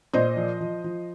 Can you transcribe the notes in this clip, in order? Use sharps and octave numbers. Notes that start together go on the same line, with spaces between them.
A#2 C5 D#5
F3
F3
F3